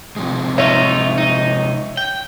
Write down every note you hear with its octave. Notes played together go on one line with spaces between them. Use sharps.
C3 F3 G#3
D#4 F4 C#5 E5
D#4
G5